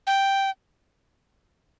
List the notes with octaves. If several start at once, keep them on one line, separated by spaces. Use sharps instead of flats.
G5